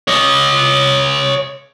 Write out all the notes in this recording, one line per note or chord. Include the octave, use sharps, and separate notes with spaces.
C#5 D#5